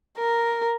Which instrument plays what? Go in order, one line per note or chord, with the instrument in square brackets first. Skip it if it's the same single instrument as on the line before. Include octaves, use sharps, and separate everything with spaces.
[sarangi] A#4